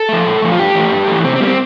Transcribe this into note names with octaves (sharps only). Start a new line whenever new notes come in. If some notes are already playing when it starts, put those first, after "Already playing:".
Already playing: A4
F3 A3
A#2
F3 A3
F4
G2 G4
E3 A3
G2
E3 A3
C3 C4
C4
G3 A#3
C4